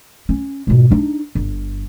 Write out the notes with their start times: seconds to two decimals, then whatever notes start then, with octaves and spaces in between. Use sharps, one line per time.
0.29 C#4
0.67 G#2 B2
0.90 D4 D#4
1.35 G1